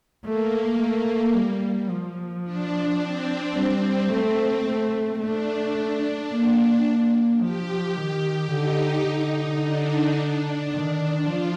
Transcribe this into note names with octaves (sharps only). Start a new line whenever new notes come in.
A3 A#3
A3
G3
F3
D4
C4
G3
A3 C4
A3
A3 D4
A#3
A#3
F3 G4
D#3 G4
D3 D#4
D3
D4
D#3
F3 F4